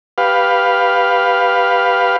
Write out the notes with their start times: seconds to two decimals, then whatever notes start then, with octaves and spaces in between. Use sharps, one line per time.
0.18 G4 B4 F5